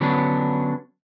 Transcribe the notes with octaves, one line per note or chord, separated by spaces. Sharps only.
D3 F#3 B3 C#4 D4